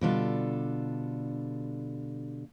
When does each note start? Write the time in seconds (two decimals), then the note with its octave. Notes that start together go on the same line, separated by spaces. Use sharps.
0.01 B2 D3 G3 D4 F4 A4